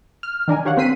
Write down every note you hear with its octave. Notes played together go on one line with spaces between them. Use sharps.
F6
D#3 D4 A#4 G#5
G4 C#5 F5 F#5
C4 A#4 B6 C7 D#7